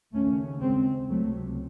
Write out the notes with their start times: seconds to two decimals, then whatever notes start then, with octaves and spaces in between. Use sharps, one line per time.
0.14 D#2 C#3 A3 C#4
0.61 G#3 C4
1.09 C#2 C3 F#3 A3